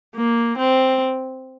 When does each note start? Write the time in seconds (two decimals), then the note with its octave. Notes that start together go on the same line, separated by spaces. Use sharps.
0.16 A#3
0.58 C4